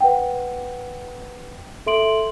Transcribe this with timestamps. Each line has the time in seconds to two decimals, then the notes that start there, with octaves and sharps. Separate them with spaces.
0.01 B4 F#5 G5
1.86 A4 E5 C6 D7 F#7